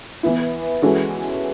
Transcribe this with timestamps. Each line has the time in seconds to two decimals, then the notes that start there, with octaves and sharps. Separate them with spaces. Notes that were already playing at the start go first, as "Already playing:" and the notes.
0.23 E3 B3 E4
0.82 E3 G#3 C#4 F#4 A4